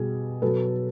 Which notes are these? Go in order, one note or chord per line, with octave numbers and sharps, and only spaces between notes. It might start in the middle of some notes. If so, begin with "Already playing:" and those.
Already playing: B2 G3 G#4
B2 F#3 A4 B4